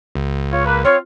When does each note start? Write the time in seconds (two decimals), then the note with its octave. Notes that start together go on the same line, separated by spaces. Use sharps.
0.15 C#2
0.52 F4 C#5
0.65 A#3 B4
0.85 C4 F4 C#5